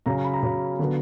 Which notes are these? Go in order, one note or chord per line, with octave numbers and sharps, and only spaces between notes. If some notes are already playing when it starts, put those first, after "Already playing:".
C#3 F#3 C#4 A#5
A#5
B5
A#5
C#3 F#3 C#4
D3 F#3 B3